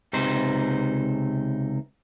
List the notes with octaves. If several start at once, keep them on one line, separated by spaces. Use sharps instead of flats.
C#2 C3 D#4 C5